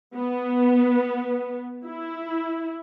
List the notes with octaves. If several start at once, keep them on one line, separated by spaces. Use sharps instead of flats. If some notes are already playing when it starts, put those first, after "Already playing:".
B3
E4